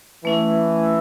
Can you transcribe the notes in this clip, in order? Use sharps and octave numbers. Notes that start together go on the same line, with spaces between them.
E3 A3 C#4 E4